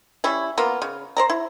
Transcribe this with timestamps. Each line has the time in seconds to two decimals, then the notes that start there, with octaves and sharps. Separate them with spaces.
0.24 G3 C#4 E4
0.58 A#3 B3 F4
0.82 C#3
1.17 C5 D5 A#5
1.30 E4